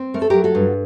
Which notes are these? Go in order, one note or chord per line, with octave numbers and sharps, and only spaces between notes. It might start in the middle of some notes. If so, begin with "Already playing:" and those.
Already playing: C4
A3 A#4
A4
F#3 G4 A#4
F#4 A4
G2